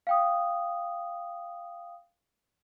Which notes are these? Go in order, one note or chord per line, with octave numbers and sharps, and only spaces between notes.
F5 G5 D#6